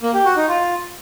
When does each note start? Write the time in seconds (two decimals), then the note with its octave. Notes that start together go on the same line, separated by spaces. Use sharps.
0.02 A#3
0.14 G4
0.25 F#4
0.37 D#4
0.48 F4